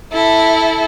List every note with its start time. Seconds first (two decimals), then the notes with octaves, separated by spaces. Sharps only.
0.13 E4 A4